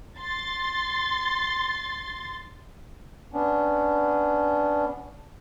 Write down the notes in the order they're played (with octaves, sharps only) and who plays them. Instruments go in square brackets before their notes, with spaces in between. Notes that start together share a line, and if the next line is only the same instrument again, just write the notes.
[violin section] C6 A6
[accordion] B3 C#4 D4